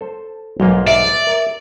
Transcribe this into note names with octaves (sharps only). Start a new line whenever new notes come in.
A4 C5
B1 G#2 F#3 A#3
D5 E5
A#4